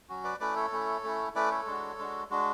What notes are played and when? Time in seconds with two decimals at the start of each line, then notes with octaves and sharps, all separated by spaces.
0.09 F#3 C#4 F#4
0.24 B4 D5
0.40 A3 C#4 E4 B4 D5
0.56 A4 C#5
0.72 A3 C#4 E4
1.04 A3 C#4 E4
1.35 A3 C#4 E4 B4 D5
1.51 A4 C#5
1.67 G#3 D4 F#4
1.99 G#3 D4 F#4
2.30 G#3 D4 F#4